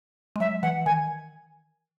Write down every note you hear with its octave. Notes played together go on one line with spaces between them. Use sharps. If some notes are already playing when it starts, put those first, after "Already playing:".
G#3
F#3 E5
E3 F#5
D#3 G#5